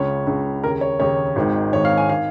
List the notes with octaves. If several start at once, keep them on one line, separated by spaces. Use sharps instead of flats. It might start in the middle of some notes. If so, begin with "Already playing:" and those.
Already playing: C#2 C#3 C#5
C#2 C#3
D#2 C#3 A#4
C#5
D#2 C#3 C#5
G#1 G#2 D#3
G#1 G#2 D#3 C#5
F5
G#5
D#3 F5